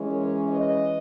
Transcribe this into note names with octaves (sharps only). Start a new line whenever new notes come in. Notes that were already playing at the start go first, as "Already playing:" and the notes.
Already playing: E3 G#3 C#4
A#4 C#5
B4 D#5